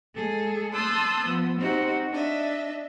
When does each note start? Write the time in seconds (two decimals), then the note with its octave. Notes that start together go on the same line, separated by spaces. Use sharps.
0.14 G#3 G#4 A4
0.74 A5 C6 D#6 E6 F#6 G6
1.25 F3 B3
1.59 C4 D#4 F#4 G4 C5
2.11 D4 D#5 E5